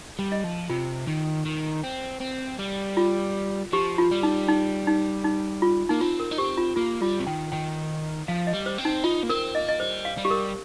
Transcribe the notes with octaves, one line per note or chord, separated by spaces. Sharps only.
G3
D#5
F3
C3 F4
D#3
D#3
C4
C4
G3
F4
F3 G4
F4
G3
D#4
D#4
D#4
D#4
F4
A#3 D#4
C4 F4
A#4
D#4
C4 G4
F4
A#3 F4
G3 F4
C3
D#3 G5
D#3 G5
F3 F5
D#5
G3
C5
C4
D#4
D#4 F4
A#3
C4 A#4
A#3 D#5
D#5
G3 C5
F5
G3
G4
A#4